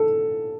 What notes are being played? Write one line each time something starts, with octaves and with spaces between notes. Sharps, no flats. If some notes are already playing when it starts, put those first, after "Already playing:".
Already playing: A4